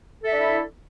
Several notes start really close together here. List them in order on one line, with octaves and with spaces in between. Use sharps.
A4 E5 D4 E4